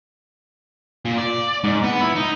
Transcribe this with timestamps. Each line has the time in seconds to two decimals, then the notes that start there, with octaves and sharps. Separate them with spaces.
1.05 A#2
1.18 D5
1.64 G#2
1.83 B3
2.01 E4
2.15 D#4